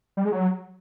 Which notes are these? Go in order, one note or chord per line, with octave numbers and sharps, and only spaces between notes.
G3
G#3
F#3